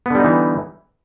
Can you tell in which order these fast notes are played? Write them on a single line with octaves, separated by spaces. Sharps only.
B3 D3 G3 D#4 E3